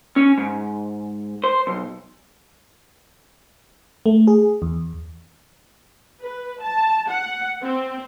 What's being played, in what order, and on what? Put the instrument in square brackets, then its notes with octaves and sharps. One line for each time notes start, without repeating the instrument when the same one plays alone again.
[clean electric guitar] C#4
G#2
C5
B1
[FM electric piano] A3
G#4
E2
[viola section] B4
A5
F#5
C4